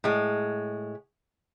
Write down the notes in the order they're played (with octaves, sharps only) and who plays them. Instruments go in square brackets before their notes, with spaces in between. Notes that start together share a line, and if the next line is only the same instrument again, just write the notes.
[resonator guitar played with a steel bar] A2 G#3